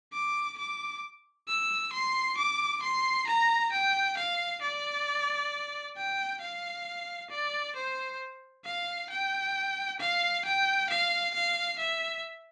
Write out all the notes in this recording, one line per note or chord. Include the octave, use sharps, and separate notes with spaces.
D6
D6
E6
C6
D6
C6
A#5
G5
F5
D5
G5
F5
D5
C5
F5
G5
F5
G5
F5
F5
E5